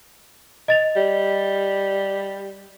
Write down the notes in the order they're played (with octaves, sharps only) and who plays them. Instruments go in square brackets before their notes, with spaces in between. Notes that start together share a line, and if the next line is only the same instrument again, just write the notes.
[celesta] D#5 A6 F7
[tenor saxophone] G3